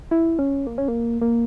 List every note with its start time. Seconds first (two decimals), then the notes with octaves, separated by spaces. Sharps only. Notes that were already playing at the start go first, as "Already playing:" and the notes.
0.11 E4
0.39 C#4
0.67 A#3
0.78 C#4
0.88 A#3
1.21 A#3